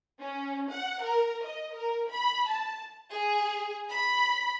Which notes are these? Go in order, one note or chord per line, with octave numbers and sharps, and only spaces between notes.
C#4
F#5
A#4
D#5
A#4
B5
A5
G#4
B5